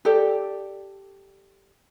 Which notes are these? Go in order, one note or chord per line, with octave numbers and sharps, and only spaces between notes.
G4 A4 D5